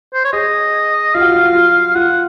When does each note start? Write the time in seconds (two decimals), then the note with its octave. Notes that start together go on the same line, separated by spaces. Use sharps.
0.14 C5
0.24 C#5
0.33 G#4 D#5
1.14 F4 F5
1.21 F#4
1.29 F4
1.36 F#4
1.44 F4
1.55 F4
1.95 F4 F#5